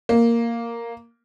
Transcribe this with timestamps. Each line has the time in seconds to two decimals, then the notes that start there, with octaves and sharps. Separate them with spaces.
0.09 A#3